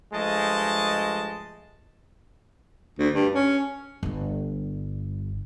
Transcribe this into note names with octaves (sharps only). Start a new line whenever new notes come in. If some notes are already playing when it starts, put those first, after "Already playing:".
G2 F3 G#3 A3 D#5 A5
D2
G2
C#4
G1 G2